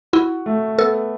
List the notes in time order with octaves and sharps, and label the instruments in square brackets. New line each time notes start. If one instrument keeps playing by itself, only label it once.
[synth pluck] E4 [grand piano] F#4
[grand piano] A3
[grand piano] B3 [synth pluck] A4